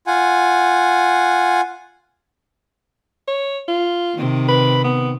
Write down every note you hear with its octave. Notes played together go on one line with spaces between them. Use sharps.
F4 F#5 G#5
C#5
F4
C3 D#3
B4
B3